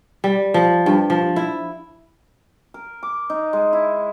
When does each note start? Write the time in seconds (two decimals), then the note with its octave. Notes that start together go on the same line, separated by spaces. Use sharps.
0.24 G3
0.54 F3
0.86 G2
1.10 F3
1.36 E4
2.74 A#4
3.03 D6
3.30 D#4
3.53 G#3
3.73 E4